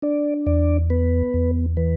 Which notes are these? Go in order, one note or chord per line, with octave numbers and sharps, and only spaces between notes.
D4 D5
E2 D5
B3 B4
E2
E3 B4